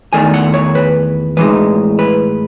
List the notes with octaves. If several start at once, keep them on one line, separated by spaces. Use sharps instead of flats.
E2 D#3 A3 G#5
F#5
C#5
B4
A2 E3 G#3 D#4 B4
B4